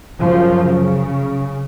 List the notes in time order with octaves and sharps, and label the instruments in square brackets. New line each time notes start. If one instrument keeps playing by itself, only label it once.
[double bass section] F#2 C#3 F3
C#3